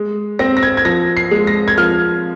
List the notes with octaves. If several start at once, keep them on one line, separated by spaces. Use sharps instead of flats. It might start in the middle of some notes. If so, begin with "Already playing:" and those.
Already playing: G#3
C4 A#6
A#6
G#6
G#6
F3 A#6
C7
G#3
A#6
G#6
F3 F6